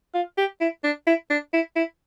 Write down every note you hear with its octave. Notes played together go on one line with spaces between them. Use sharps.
F4
G4
E4
D4
E4
D4
E4
E4